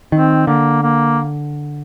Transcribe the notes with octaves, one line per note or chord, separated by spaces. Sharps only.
D#3 C4
D3 A#3
A#3